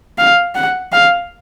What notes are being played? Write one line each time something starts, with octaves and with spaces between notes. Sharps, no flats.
F5
F#5
F5